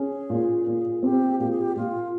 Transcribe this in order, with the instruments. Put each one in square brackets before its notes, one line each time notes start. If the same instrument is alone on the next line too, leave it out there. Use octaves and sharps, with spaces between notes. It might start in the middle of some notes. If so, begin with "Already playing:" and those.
Already playing: [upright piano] C#4 [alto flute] G#4
[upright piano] A#2
A#2
[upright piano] C4 [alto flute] G4
[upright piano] A#2 [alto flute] G4
[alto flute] G#4
G4
[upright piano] A#2 [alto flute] F4